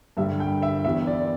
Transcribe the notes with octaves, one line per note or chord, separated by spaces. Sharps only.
G2 D3 G3 E5
G5
E5
E2 E3 G3 E5
D5